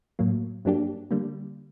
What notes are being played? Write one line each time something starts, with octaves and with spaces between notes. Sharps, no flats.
A2 F#3 A#3
G2 F#3 A#3 D4 G4
D3 G3 A#3